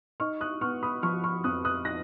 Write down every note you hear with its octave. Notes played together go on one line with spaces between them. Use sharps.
D#4 C#6 F6
D#6 F#6
B3 C#6 F6
B5 D#6
F3 C#6 F6
C#6 F6
F2 D#6 F#6
D#6 F#6
D#4 F#6 A#6